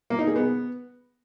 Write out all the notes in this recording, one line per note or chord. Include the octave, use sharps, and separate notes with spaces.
A#3
D#4
G#4
B3